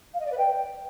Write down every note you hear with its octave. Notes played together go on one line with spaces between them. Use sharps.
F5
D#5
D5
B4
G5